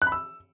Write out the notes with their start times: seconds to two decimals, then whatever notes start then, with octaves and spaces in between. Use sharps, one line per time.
0.02 F#6
0.07 B5
0.12 E6